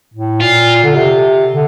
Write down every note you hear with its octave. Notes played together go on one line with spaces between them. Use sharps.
A2
A#2 F4
D3
C3
D3